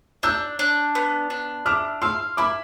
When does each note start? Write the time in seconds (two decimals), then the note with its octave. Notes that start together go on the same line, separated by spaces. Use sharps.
0.23 D4 E6 G6
0.59 D4
0.95 B3
1.30 D4
1.66 E4 D6 F6
2.02 F5 C6 E6
2.37 E4 B5 D6